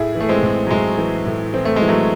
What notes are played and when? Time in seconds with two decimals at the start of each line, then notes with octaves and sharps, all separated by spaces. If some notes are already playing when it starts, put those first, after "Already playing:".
Already playing: A2 E4 G#4
0.15 E3
0.20 A3
0.29 G#3 C4
0.43 A2
0.67 F#3
0.70 A2 G#3
0.98 E3
1.26 A2
1.54 E3 C4
1.65 A3
1.76 G#3
1.82 E3
1.88 F#3 A3